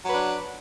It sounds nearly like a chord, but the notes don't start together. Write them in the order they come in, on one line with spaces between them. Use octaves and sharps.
F#3 B4 D4